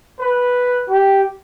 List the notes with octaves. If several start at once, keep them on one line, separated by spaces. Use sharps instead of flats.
B4
G4